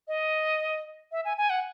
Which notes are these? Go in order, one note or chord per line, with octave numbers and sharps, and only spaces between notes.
D#5
E5
G#5
G#5
F#5